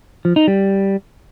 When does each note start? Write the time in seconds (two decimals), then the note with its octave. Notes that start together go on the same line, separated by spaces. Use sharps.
0.25 F3
0.36 D#4
0.48 G3